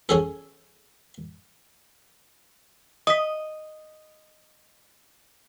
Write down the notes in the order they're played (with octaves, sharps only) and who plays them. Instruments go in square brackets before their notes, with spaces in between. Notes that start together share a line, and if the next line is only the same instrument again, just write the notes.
[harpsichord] C#4 G#4 A4
[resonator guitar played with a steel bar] D#5 [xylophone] D#6 B6